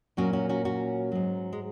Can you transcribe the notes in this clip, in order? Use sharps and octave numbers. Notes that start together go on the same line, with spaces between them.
A#2 F#3 C#4 F#4
C#4 F#4
C#4 F#4
C#4 F#4
G#2 F#3
G#3